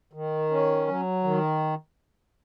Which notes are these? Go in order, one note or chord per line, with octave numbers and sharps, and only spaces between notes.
D#3
C#4
F#3
D#3